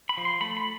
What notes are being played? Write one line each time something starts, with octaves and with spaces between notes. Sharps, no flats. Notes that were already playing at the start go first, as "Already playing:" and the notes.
B5
F3
C6
A3 B5
B5